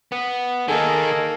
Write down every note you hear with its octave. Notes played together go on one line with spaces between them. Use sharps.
B3
D#3 A#3 D#4 G#4 A4